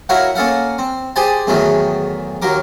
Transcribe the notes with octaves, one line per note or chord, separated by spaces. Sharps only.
E4 F#4 A#4 C#5 F5 F#5
A#3 C#4 A4 F5 F#5
C4
G4 G#4 C5 G#5 A5
E2 G#2 D#3 E3 F#3 A3
D#2 F#3 A#4 D6